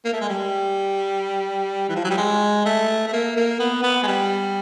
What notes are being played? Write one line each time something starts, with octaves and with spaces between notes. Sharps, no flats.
A#3
A3
G#3
G3
E3
F3
F#3
G3
G#3
A3
A3
A#3
A#3
B3
B3
G#3
G3